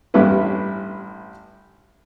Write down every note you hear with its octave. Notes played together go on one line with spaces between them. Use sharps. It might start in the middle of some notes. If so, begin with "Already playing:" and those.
A1 G2 C#4 E4 B4